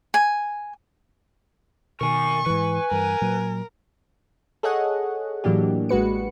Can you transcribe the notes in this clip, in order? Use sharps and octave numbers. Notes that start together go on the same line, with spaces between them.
G#5
B2 D#3 A#4 G#5 C#6
G#2 E3 B4 G#5
G2 E3 A#4
A#2 F#3
G#4 A4 C#5 D#5 F#5
A2 E3 F#3 A#3 D4 G4
A1 G#3 F#4 B4 C#7